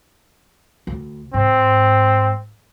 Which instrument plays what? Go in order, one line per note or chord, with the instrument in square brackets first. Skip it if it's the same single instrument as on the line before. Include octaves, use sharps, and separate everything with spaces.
[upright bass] D2
[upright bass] G#2 [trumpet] C4